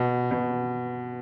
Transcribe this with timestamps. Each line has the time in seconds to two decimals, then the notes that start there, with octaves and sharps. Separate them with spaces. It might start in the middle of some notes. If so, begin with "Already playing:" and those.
Already playing: B2
0.31 B2